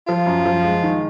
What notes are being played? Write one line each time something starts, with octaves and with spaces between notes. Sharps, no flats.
F3 F4
F#2
F3
G#3
D#3